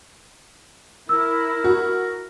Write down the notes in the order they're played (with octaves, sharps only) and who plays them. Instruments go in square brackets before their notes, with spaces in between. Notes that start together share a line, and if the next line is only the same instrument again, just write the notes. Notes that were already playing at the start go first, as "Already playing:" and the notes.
[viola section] E4 [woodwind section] A#4 [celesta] E6
[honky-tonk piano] F#4